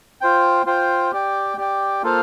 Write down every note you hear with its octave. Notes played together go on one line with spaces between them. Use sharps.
F4 C5 G5
F4 C5 G5
G4 D5 G5
G4 D5 G5
A#3 F4 A4 C5 F5